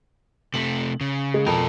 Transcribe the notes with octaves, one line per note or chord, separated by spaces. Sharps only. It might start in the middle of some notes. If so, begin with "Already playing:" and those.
C3 A3 F#7
C#3
G#3
F2 B2 A#4